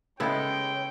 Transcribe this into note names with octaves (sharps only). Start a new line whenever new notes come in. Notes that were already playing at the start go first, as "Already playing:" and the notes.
C#3 G#3 B3 E4 A4 C#5 G5